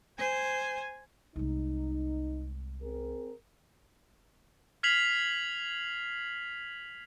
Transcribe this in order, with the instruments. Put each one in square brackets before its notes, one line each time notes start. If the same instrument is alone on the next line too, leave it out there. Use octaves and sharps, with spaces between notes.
[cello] C5 [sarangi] G#5
[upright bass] C2 G#3 [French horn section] D#4
[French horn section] C4 G#4 A#4
[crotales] F6 G#6 B6 C7 F7 F#7